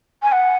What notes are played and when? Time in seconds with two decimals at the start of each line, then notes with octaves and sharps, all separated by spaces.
0.23 G#5
0.32 F#5